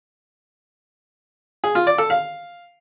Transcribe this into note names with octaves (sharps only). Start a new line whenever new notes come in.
G#4
F4
D5
A4
F5